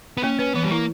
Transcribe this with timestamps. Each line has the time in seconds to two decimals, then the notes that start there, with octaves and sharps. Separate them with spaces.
0.17 B3
0.23 A#3 C#4
0.39 C#4 B4
0.54 E3 B3
0.64 G3
0.70 A#3 E4